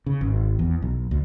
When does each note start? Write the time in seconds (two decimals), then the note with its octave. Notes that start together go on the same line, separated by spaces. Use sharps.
0.06 C#3
0.21 G#1
0.59 E2
0.82 B1
1.11 D2